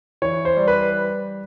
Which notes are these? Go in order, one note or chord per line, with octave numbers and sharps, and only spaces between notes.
E3 C#5
C5
G3
B4